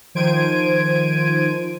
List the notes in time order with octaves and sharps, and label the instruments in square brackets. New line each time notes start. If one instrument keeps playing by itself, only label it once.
[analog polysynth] D#3 F3 C5 G#6 D7 D#7